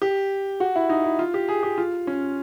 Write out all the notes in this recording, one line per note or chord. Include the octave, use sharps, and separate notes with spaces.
G4
F#4
E4
D#4
E4
F4
G4
G#4
G4
F4
C#4